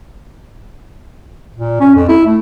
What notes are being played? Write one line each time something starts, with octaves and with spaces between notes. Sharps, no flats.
A#2
C#4
F2
E4
A3